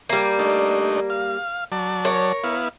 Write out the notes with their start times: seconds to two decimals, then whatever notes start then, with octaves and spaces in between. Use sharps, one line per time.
0.09 G3 A#3
0.39 A3 D4 D#4
1.10 F5
1.72 F#3 D5 A5
2.05 A#4 C#5
2.44 B3 E4 F5